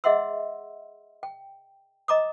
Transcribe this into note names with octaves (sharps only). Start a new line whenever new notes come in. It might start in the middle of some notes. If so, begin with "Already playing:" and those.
G#4 D#5 E5 F#5 C6 E6
G5
D#5 A#5 D6 D#6